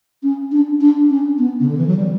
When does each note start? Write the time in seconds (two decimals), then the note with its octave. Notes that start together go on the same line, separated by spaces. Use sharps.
0.23 C#4
0.52 D4
0.81 D4
1.09 C#4
1.38 B3
1.60 C#3
1.68 D3
1.77 E3
1.87 F#3
1.96 G3